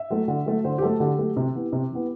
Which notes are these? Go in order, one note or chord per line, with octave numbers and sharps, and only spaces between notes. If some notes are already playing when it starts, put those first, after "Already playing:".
Already playing: E5
F#3 A3
D3
F#3 A3
D3 C5
G4
F#3 A3 A4
D3 G4
F#3 A3
C3
E3 B3
C3
E3 B3